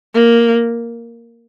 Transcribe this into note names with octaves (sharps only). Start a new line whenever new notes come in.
A#3